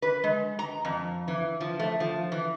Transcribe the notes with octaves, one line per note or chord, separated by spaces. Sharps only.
B4
G#3
A#5
F2
E3
F3
A3
F3
E3